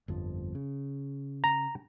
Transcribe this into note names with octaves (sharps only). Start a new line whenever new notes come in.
G1 F2 F3
C#3
A#5